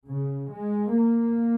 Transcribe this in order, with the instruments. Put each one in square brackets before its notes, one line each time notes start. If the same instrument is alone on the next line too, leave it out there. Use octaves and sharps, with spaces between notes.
[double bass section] C#3
G#3
A#3